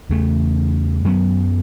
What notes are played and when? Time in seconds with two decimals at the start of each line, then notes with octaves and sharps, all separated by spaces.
0.09 E2 C#3 A3
1.04 F#2 F#3 B3